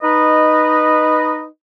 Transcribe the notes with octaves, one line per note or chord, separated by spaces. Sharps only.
D#4 B4 D#5